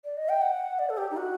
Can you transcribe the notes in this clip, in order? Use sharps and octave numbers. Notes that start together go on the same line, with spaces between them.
D5
D#5
G5
F#5
D5
A4
G4
D#4
F#4